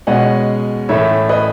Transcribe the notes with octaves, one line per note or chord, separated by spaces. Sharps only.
B2 G#3 C#4 D#5 F#5
A2 E3 A3 C#4 C#5 E5
B4 D#5